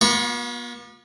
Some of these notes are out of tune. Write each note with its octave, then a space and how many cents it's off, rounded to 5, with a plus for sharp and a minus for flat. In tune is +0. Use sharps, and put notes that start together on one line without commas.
B3 -40 F4 +30 C#6 +0